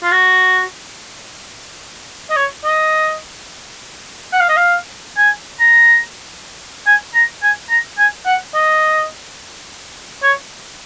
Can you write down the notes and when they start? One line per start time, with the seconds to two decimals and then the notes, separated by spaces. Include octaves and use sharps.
0.03 F4
0.12 F#4
2.30 D#5
2.36 C#5
2.64 D#5
4.33 F#5
4.40 F5
4.49 D#5
4.57 F5
5.17 G#5
5.60 A#5
6.86 G#5
7.15 A#5
7.43 G#5
7.70 A#5
7.98 G#5
8.26 F#5
8.54 D#5
10.23 C#5